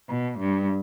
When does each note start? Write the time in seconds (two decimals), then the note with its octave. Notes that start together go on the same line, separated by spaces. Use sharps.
0.09 B2
0.39 G2